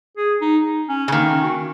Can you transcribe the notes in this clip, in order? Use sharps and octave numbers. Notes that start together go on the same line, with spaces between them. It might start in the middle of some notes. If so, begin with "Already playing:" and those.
G#4
D#4
D#4
C#4
C#3
D#3 A#3
C#4
F#4